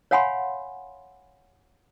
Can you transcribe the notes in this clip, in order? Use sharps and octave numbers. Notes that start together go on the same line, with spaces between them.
C#5 F5 F#5 G#5 B5 C6